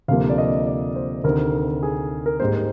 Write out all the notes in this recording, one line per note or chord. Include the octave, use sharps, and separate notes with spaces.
D2 C3 F3 A#3 F5
D5
D#5
D5
C5
D2 C3 D#3 A#4
G#4
A#4
G#2 G3 A#3 C5